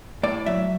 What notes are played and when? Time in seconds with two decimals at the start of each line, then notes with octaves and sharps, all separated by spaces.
0.23 A2 D5
0.46 F#3 E5